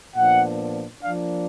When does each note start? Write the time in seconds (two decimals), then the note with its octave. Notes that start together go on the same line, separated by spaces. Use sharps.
0.15 A#2 F3 B3 D4 F#5
1.02 F3 A#3 D4 F5